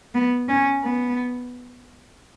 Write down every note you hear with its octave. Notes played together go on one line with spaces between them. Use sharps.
B3
C#4
B3